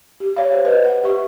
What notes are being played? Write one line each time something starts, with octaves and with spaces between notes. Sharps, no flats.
G4
C#5 D5 F5
C5
B4 D#5
F#5
G4 E5 C#6